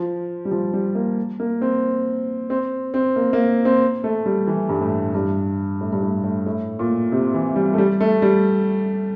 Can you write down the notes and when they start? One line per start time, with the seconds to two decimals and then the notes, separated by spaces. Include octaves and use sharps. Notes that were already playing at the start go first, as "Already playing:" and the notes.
Already playing: F3
0.45 G3
0.51 F3
0.74 G3
0.95 A#3
1.40 A#3
1.61 C4
2.50 C4
2.94 C4
3.16 A#3
3.33 A#3
3.65 C4
4.04 A3
4.26 G3
4.47 E3
4.69 G2
4.81 A2
5.14 G2
5.81 A2
5.93 G2
6.02 A2
6.24 A2
6.46 A2
6.79 A#2
7.12 C3
7.34 E3
7.56 G3
7.74 A3
7.78 G3
8.00 A3
8.22 G3